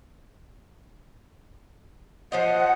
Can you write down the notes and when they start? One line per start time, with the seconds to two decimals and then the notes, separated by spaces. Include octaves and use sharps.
2.32 F3 C5 D#5 F#5